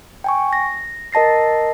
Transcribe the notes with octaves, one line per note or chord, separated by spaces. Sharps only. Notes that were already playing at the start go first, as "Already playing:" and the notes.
G5 G#5 C#6
A#6
A#4 D#5 A5 A#6 C7